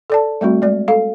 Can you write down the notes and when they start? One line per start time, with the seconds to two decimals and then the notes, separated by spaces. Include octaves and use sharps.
0.10 A4 D5 A5
0.41 G3 A3 C4 F#4
0.62 G#3 D5
0.88 A4 F5